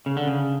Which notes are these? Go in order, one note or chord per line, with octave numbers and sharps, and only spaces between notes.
C#3
D3
C#3